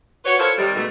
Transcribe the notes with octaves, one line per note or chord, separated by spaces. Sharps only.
F4 F#4 B4 C#5
E4 F4 A4 A#4 C5 C#5
C3 D#3 G3
G#2 B2 A3